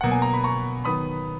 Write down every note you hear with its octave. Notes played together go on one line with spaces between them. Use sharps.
B2 F#3 A#3 F#5
G#5
A#5
B5
A#5 C#6
D#3 F#3 B3 B5 D#6